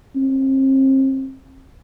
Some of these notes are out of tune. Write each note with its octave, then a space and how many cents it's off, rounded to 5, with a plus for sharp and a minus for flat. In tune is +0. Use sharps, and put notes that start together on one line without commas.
C4 +35